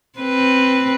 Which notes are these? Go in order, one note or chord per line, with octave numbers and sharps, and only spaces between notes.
C4 B4